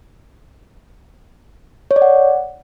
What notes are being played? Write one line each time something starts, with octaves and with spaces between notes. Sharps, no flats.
C#5
D5
F#5